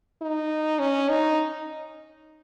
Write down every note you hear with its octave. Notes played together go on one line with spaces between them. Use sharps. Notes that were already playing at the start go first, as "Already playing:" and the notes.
D#4
C#4
D#4